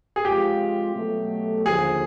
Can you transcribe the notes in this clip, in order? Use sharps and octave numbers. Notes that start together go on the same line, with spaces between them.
G#4
F3 G#3 C4 F4 G4
B2 F#3 A3
D#2 D3 F3 G#4